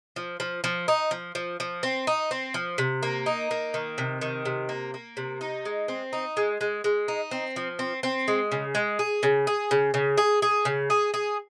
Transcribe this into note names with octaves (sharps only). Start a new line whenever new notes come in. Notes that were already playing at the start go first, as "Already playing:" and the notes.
F3
F3
F3
D#4
F3
F3
F3
C4
D#4
C4
F3
C3
A#3
D#4
A#3
D#3
C3
D#3
C3
A#3
A#3
C3
D#4
G#3
C4
D#4
G#3
G#3
G#3
D#4
C4
F3
C4
C4
G#3
C#3
G#3
G#4
C#3
G#4
C#3
C#3
G#4
G#4
C#3
G#4
G#4